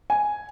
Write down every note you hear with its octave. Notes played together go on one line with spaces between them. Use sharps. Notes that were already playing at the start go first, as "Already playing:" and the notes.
G#5